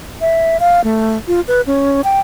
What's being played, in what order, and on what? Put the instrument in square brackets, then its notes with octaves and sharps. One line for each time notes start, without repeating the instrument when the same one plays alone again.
[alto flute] E5
F5
A3
F4
B4
C#4
G5